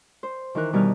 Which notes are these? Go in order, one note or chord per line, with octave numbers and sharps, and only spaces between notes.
C5
D#3 E3 A#4 F#6
B2 G3 A#4 B4 G#5 F6